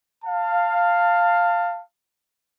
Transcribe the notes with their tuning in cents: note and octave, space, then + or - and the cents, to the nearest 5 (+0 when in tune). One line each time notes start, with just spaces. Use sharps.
F5 +0 A5 +25